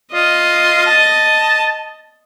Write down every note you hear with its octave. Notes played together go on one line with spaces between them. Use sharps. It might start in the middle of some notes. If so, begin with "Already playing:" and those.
F4 D#5
A5